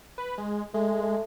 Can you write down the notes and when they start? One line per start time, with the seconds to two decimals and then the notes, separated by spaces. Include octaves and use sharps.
0.18 B4
0.38 G#3
0.74 G#3 A3
1.02 A3